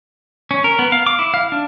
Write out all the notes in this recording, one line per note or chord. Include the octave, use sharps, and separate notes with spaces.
C#4
A#4
B3
F5
D6
E4
F5
D4